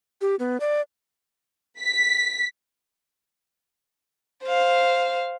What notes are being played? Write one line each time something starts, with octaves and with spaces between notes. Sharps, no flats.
G4
B3
D5
B6
C5 F5